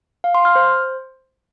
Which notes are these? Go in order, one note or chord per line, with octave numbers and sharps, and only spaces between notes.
F5
C6
F6
C5